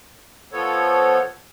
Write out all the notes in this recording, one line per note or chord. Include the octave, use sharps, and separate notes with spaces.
F3 B3 A4 C#5